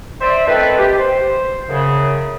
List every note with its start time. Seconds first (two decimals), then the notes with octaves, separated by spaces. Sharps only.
0.20 C5 D5 E5
0.47 D#3 A3 C4 F4 B4
0.78 G4
0.98 C5
1.68 F#2 C#3